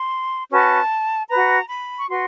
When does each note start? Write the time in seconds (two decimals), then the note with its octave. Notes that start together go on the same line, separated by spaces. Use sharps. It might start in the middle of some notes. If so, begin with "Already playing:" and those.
Already playing: C6
0.51 C#4 F#4 B4 A5
1.29 F#4 B4 A#5
1.69 B5
1.98 C#6
2.08 F#4 B4 C6